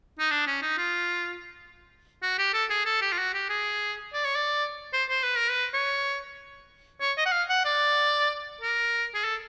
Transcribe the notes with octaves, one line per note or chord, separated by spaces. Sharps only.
D#4
D4
C#4
D#4
F4
F#4
G4
A4
G#4
A4
G4
F4
F#4
G4
G#4
D5
C#5
D5
C5
C5
B4
A#4
B4
C#5
C#5
D#5
F#5
F5
F#5
D5
A#4
G#4
A4